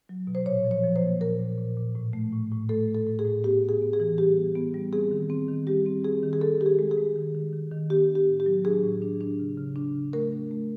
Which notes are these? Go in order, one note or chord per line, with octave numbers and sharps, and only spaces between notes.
F#3
B2
C5
A#2 C#5
F3
C#5
F3
C5
A#3
A#2 A#4
A#2
A#2
A#2
A2
A3
A2
A2
A3 A4
A3
A4
A2
G#4
A2
B3 G4
B3
G#4
B3
G#4
E3
G3 G4
B3
B3
G3
C4 G#4
D#3
C4
D#3
G3 G4
C4
C4 G#4
D#3
G#4
D#3 A4
D#3 G4
G#4
G#3
G#4
G#3
D#3
D#3
D#3
D#3
B3 G4
D4
G4
A2
G4
F#3
D4 G#4
A2
D4
D4
C#3
C#3
D4
C#3
A3 A#4
D4
A3